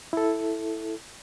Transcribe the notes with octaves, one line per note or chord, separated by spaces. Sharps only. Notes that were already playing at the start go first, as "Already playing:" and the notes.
E4 A4